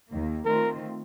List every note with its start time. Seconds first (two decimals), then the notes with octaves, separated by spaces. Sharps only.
0.11 D#2 D#3 A#3
0.45 D#3 A3 C4 F4 A#4